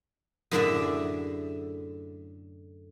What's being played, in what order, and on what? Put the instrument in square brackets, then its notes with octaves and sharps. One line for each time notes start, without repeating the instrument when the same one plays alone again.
[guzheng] F#2 A2 D3 G#4 D5 E5